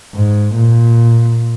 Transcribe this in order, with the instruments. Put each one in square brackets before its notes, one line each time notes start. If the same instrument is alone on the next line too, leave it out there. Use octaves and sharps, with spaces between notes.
[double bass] G#2
A#2